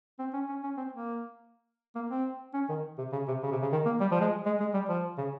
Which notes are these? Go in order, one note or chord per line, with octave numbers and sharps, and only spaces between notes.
C4
C#4
C#4
C#4
C4
A#3
A#3
C4
C#4
D#3
C3
C#3
C3
C#3
C3
C#3
D#3
A#3
G3
F3
G#3
G#3
G#3
G3
F3
C#3